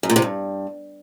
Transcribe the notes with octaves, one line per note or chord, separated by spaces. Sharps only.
F#2
A#2
C3
G2